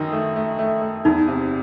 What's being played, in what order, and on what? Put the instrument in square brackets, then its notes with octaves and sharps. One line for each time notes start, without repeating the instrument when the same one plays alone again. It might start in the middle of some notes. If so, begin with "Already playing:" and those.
Already playing: [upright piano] F#2 D#3 D#4
A3
A3
A3
A3
[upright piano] E2 [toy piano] D#4
[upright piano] C3